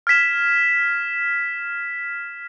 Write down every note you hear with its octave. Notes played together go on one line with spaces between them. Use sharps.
F6 G#6 B6 E7